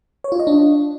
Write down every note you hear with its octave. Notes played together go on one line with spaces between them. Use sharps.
C#5
F4
D#5
D4